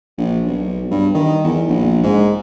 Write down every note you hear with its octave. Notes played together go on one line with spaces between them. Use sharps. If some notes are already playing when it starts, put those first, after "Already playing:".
A#1
B1
G2
D#3
E2
A#1
G#2